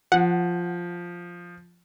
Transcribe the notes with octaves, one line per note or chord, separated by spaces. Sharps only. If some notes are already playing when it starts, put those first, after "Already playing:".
F3 F#5